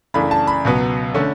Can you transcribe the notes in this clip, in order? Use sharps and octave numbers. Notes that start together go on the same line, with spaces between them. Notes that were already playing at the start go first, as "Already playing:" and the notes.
F#2 C#3 E3 A3 D4 B5
A5
B5
C#2 B2 F#3 B3
D3 A3 C#4